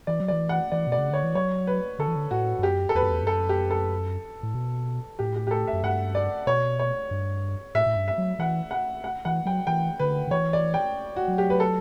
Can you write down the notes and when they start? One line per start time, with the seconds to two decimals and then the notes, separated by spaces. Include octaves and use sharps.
0.07 E3 D5
0.20 F#3
0.28 E3 D5
0.49 F#5
0.72 E3 D5
0.87 B2 D5
0.98 C#3
1.11 D3 C#5
1.24 E3
1.35 F#3 C#5
1.67 B4
1.99 D3 A4
2.08 E3
2.16 D3
2.31 A2 F#4
2.59 G2
2.63 F#2 G4
2.89 A4
2.95 E2 B4
3.03 F#2
3.11 E2
3.22 G2
3.27 F#2 A4
3.49 G4
3.71 A4
4.43 A2
4.55 B2
5.19 A2 G4
5.36 G4
5.47 G4
5.51 A4
5.67 E5
5.73 F#2
5.84 G2 F#5
6.15 D5
6.47 B2 C#5
6.79 C#5
7.11 G2
7.75 A2 E5
7.86 A2
7.96 G2
8.08 E5
8.18 F#3
8.39 E3 F#5
8.71 F#5
9.04 F#5
9.25 E3 F#5
9.45 F#3 G5
9.67 E3 G5
9.99 D3 B4
10.27 D3
10.31 E3 C#5
10.53 D5
10.74 G5
11.16 F#4
11.28 F#3
11.38 G4
11.50 B4
11.60 A4